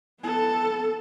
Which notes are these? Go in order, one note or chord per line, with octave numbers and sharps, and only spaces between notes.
B3 A4